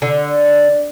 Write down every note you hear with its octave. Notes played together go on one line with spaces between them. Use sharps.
D3